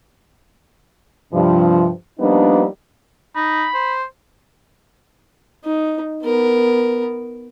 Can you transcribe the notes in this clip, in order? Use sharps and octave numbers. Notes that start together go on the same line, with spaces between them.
G2 C3 F3
F3 G3 A#3 B3 D4 D#4
D#4 B5
C5
D#4
B3 A#4